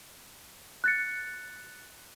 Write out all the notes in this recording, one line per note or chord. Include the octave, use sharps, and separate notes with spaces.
F#6 A6 C#7